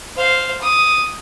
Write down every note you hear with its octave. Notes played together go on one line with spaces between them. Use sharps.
C5 F5
D6 D#6